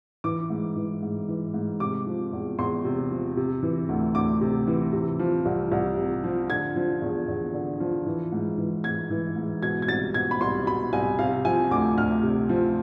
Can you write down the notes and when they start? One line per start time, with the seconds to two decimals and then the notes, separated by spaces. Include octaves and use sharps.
0.24 E3 D6
0.50 G#2
0.76 E3
1.02 G#2
1.29 E3
1.54 G#2
1.80 C3 D6
2.06 F3
2.32 E2
2.58 E2 C6
2.85 C3
3.11 F3
3.37 C3
3.63 E3
3.89 D2
4.15 D2 D6
4.41 C3
4.67 E3
4.93 C3
5.20 F3
5.45 C2
5.72 C2
5.98 C3
6.24 F3
6.50 D3 G#6
6.76 F3
7.02 E2
7.28 E2
7.54 D3
7.80 F3
8.06 E3
8.32 G#2
8.58 E3
8.84 G#2 G#6
9.10 E3
9.36 G#2
9.63 B2 G#6
9.82 G#6
9.88 C2 A6
10.14 B2 G#6
10.31 B5
10.41 C2 C6
10.66 B2 B5
10.93 C2 G#5
11.19 C3 F5
11.45 F3 G#5
11.71 D2 D6
11.97 D2 F6
12.23 C3
12.49 F3